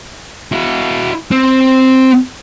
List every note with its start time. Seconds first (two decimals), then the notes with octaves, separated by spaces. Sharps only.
0.52 E4 F#4
1.31 C4